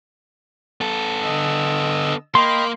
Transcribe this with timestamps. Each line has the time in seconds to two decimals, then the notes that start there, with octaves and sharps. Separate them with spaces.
0.81 B3 A4
1.22 D3 D#5 E6
2.35 A#3 D#5 G5 B5 C6